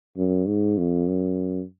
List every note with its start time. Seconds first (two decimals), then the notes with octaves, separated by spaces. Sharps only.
0.17 F#2
0.47 G#2
0.78 F2
1.08 F#2